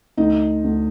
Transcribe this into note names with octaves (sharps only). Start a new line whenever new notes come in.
D2 D#4
D2